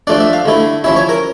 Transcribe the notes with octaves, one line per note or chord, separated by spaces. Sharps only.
F3 A3 D4 D5
E5
F5
D3 A3 E4
F3 C#4 E4 E5
C#5
A#4